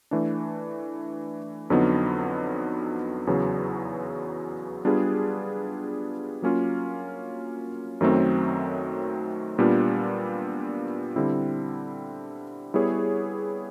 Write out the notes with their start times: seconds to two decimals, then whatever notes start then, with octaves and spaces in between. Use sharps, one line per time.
0.11 E3 A3 D4
1.70 F2 D3 F#3 B3 D#4
3.27 E2 C#3 F#3 B3
4.85 G3 B3 D4 F4 G#4
6.42 F#3 A#3 C#4 F4
8.01 F#2 D#3 F#3 A3 C4
9.58 A#2 G3 B3 D4 F4
11.16 D3 G3 C4 E4
12.74 G3 B3 E4 G#4 C#5